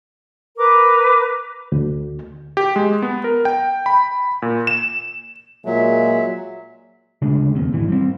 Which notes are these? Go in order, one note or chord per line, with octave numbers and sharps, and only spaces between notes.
A#4 B4 D6
D2
G4
G#3
B3
A#4
G5
B5
A#2
E7
A#2 F#3 G#3 E5
D2 C#3 G#3 D4
F1 D#2 C3
G#1 E3
G3 C4